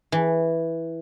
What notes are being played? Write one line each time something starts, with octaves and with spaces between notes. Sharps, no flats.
E3